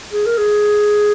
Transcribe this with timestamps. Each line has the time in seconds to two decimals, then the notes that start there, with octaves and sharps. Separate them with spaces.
0.13 G#4
0.26 A#4
0.38 G#4